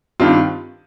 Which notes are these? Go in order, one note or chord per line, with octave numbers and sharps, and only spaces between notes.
G2 D#3 C4 F4